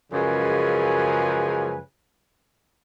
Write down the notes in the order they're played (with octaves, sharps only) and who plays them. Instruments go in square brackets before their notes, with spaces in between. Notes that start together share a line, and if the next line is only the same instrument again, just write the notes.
[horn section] F#2 C#3 F3 G#3 B4 G#5